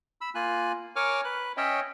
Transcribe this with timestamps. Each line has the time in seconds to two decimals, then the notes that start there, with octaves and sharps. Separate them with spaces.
0.21 B5 E6
0.35 A#3 F4 G#5 F#6
0.96 A#4 C#5 G#5 C#6 D6 F6
1.24 B4 F#6
1.57 C#4 C#5 D#5 E5 G5